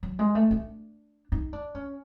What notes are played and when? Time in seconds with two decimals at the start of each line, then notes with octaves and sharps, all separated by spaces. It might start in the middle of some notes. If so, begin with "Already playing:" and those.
0.03 F#3
0.19 G#3
0.35 A3
0.51 D4
1.32 D#4
1.53 D4
1.75 C#4